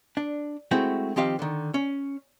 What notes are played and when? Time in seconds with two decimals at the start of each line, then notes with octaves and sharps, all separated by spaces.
0.17 D4
0.71 G#3 A3 C4 E4 F#4
1.16 D#3 F3 C4 G4 D#5 F5
1.39 D3 D#3
1.74 C#4